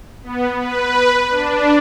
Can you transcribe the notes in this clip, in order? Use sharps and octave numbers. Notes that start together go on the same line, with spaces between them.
B3
B4
D4